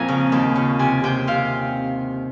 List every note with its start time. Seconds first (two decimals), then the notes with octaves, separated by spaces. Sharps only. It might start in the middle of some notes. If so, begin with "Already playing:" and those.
Already playing: F2 A#2 G#5 A#5
0.08 C#3
0.32 D#2
0.55 C#3
0.79 C3 G#5
1.04 C3 G5
1.27 C3 F5